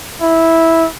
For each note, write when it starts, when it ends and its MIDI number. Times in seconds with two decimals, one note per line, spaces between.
0.21 0.86 64